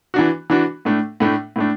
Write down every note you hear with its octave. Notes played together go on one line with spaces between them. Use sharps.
E3 D4 F#4
E3 D4 F#4
A2 A3 D4
A2 A3 D4
A2 A3 D4